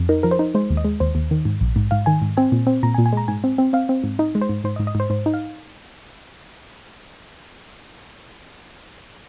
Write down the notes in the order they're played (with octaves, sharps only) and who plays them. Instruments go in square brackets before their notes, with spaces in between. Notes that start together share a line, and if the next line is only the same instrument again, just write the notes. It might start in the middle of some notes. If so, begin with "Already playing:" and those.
Already playing: [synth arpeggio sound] F2
D#4 A#4
F3 A#4
C5
D#4
G#3 C5
D#2
D#5
G#3
D#2 C5
D#2
D#3
G#2
A#1
G#2
G#2 F5
D#3 G#5
G#2
C4 G#5
A#2
C4
A#2 A#5
G#5
A#2
G#5
G#3 A#5
G#2 G#5
C4
C4
C4 F5
C4
G#2
D#4 D#5
G#3
C5
G#2
G#2 C5
D#5
G#2
D#5
G#2 C5
G#2 C5
D#4
F5